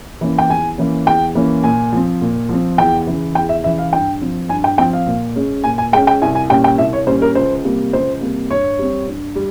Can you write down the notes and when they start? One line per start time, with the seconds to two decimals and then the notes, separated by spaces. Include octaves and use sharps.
0.21 E3 A#3 C#4
0.39 G5
0.49 E2 G#5
0.78 E3 A#3 C#4
1.06 E2 G5
1.35 E3 A#3 C#4
1.64 A#2 G#5
1.92 F3 C4
2.22 A#2
2.49 F3 C4
2.78 E2 G5
3.07 C#3 E3
3.35 E2 G5
3.49 E5
3.64 C#3 E3 E5
3.78 F5
3.93 G2 G5
4.22 F3 C4
4.49 G2 G#5
4.64 G5
4.78 F3 C4 G5
4.93 F5
5.07 A#2
5.36 G#3 C#4
5.64 A#2 G#5
5.78 G#5
5.92 G#3 G5
5.97 C#4
6.07 G5
6.22 C2 G#5
6.35 G#5
6.49 A#2 G3 C#4 G5
6.64 G5
6.78 C2 E5
6.93 C#5
7.07 A#2 G3 C#4 C5
7.22 A#4
7.35 C#2 C5
7.64 C3 G3 A#3
7.93 C#2 C5
8.21 C3 G3 A#3
8.51 G2 C#5
8.79 G3 C4
9.07 G2
9.35 G3